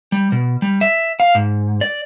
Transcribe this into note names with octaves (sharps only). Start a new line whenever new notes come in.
G3
B2
G3
E5
F5
G#2
D5